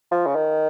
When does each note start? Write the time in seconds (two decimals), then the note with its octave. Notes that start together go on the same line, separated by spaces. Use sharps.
0.11 F3
0.26 C#3
0.35 D#3